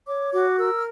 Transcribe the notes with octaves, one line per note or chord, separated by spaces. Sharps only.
C#5 D6
F#4 D6
A#4 E6
F6